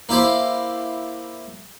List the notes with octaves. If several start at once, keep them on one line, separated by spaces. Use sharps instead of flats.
A#3 E4 G4 C5